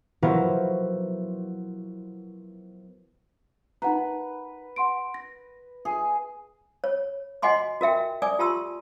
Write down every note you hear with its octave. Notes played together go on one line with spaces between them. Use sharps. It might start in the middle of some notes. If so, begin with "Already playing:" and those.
F3 F#3 B3 E4 A#4
D#4 B4 F#5 A#5
F#5 C6 D7
A#6
G#4
C#5
F#4 D#5 F#5 G#5 C6 D6
F#4 A#4 E5 G5
D5 G#5 D6 D#6
F4 G4 A5 C6 E6